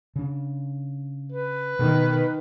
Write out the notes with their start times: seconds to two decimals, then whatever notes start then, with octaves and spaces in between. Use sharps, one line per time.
0.16 C#3 D4
1.32 B4
1.79 B2 D#3